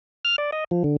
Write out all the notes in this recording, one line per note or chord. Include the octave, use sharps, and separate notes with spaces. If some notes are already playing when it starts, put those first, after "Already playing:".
F6
D5
D#5
F3
D3